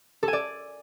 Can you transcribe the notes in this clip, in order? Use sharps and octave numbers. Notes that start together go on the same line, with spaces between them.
A4
G#5
D5